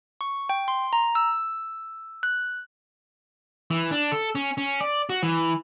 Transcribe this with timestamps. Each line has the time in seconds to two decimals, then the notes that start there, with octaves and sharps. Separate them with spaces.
0.21 C#6
0.49 G5
0.68 C6
0.93 A#5
1.15 E6
2.23 F#6
3.71 E3
3.92 D4
4.12 A4
4.35 C#4
4.58 C#4
4.81 D5
5.10 F#4
5.23 E3